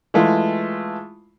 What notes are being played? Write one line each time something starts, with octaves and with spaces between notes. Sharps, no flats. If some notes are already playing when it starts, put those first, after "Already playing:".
E3 G#3 A3 F4